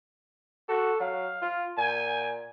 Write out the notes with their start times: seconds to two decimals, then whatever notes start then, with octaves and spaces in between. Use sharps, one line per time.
0.69 F#4 A4
1.00 F#3 F5
1.42 F4
1.77 A#2 G#5